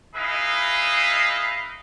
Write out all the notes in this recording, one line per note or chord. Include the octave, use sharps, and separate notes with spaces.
D#4 E4 G#4 B4 D#5 F5